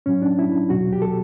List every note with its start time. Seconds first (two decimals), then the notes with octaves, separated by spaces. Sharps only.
0.06 A2 F#3 C#4
0.22 D4
0.39 E4
0.70 E2 B2 F#3 F#4
0.92 G4
1.02 A4